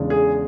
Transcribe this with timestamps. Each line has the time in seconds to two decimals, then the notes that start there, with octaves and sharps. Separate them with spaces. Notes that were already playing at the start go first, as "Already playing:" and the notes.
Already playing: E2 C#3 G#3 D4
0.10 G#4